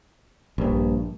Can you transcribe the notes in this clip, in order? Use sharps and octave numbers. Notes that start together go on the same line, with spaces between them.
A#1 G2